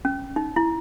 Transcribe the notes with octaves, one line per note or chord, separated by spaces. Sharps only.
C#4
D#4
E4